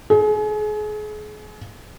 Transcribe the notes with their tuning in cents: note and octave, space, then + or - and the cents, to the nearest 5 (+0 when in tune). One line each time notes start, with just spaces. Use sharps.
G#4 +35